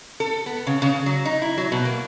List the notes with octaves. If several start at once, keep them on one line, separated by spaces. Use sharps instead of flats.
A4
B3
C#3
C#3
F#3
D#4
E4
F#3
B2
A#3